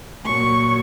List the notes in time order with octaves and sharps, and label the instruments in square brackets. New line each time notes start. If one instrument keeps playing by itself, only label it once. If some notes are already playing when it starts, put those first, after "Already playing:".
[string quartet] A#2 F#3 C#6